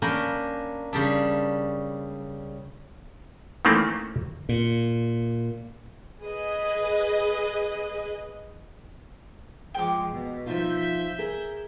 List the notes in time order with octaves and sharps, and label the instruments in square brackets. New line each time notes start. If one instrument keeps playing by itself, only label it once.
[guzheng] A#3 C#4 D4 A#4 G5 B5
C#3 G3 D4
[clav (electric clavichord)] D#3 E3 A3 A#3 C4 C#4
[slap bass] A#2
[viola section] G#4 B4 D#5
[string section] F3 G#3 [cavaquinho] G5 D6
[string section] B2
[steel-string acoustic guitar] F3 D#4 F4 [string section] E5 G6
[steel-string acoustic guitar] G#4 A#4